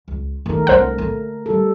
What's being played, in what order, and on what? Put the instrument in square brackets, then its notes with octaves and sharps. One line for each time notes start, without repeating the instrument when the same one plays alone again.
[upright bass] C#2
[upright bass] D#3 [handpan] A3 A#4
[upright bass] C2 D4 [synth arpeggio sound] C5 F#5
[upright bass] D3 [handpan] A3
[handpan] G3 A4